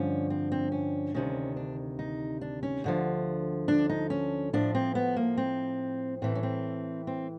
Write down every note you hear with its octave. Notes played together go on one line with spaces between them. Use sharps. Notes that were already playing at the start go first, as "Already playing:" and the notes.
Already playing: G2 D3 F3 C#4
C4
C4
C#4
D2 C3 D#3 C#4
D4
D#4
D4
C#4
D2 D3 F3
D4
D#4
C#4
A2 F3 D4
C4
B3
A#3
C4
A2 E3 C4
C#4
C4
C4